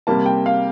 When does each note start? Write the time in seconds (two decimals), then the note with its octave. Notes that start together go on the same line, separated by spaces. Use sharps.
0.07 C3 G3 A#3 A5
0.26 G5
0.46 F5